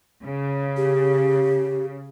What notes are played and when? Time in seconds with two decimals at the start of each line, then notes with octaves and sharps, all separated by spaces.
0.24 C#3
0.77 G4